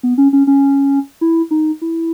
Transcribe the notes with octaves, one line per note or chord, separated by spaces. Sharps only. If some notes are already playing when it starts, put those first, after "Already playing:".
B3
C#4
C#4
C#4
E4
D#4
E4